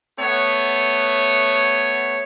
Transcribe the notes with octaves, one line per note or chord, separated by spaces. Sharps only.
A3 B3 C#5